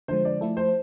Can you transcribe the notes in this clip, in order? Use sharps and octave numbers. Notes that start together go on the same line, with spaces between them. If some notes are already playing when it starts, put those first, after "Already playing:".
D3 F3 G#3 C5
D5
F3 A3 E4 A4
C5